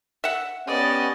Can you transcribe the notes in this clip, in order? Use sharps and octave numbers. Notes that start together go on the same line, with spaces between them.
E5 F#5
B3 C#4 G4 D5 D#5